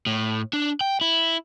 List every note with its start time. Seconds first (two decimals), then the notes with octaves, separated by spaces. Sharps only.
0.06 A2
0.53 D4
0.81 G5
1.01 E4